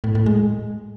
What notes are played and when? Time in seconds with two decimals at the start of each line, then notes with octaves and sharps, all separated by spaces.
0.04 A2
0.15 A2
0.26 G#3